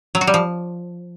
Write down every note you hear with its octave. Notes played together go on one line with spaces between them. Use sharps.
F#3
F#4
G3
F3